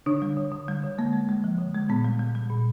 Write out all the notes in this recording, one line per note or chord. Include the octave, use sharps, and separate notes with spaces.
D3 D4
G3
D3
D3
G3
D3
G#3 A#3
G#3
G#3
F3
D3
G#3
A#2 B3
G3
G3
G3
A#2